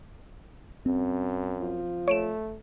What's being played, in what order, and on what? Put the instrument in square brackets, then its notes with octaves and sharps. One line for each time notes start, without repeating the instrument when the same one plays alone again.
[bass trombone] F#2 [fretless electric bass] C4
[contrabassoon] F3
[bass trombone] A3 [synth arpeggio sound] C#5 D7 E7